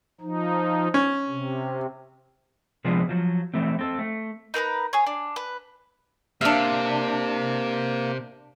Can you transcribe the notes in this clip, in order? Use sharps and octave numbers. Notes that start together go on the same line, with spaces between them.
F3 D#4
C#4
C3
C3 F3 G#3 B3 C4 D4
F3 F#3
E3 A3 C4
C4 A4
A3
D#4 A#4 B4 B5
G#4 C#5
D4
B4
C3 A#3 D4 E5 F5